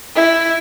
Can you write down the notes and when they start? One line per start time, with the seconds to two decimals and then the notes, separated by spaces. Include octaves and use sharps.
0.16 E4